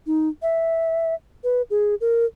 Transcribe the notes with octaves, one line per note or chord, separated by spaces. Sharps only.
D#4
E5
B4
G#4
A#4